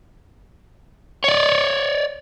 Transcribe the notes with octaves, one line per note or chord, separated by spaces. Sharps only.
C#5 D5